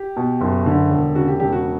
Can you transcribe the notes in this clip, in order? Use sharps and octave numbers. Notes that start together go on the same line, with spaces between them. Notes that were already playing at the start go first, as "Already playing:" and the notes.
Already playing: G4
B2
F#1
D3
E1
C#3 F#4
G4
E1 G4
F#4